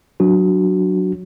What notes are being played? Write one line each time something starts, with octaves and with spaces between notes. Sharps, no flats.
F#3 D4 F#4